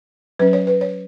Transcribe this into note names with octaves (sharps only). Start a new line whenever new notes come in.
F#3 C#4 B4
C#5
B4
C#5